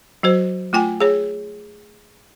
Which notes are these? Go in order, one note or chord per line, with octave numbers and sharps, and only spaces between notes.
F#3 F#4 C5
A3 F4 G5 G#5
G#4 C#5